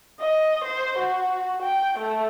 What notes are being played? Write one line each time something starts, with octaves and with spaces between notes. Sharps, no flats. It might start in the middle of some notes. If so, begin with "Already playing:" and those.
D#5
C5
F#4
G5
A3